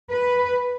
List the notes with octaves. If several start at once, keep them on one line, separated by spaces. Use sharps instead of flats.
B4